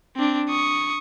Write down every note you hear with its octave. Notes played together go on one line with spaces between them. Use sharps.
C4 D4
C#6 D#6